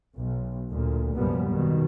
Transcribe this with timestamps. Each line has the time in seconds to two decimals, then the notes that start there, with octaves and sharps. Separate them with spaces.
0.17 B1
0.71 D2 A#2
1.16 C2 F#2 A#2 F3 G3 B3
1.47 G#1 B2 D#3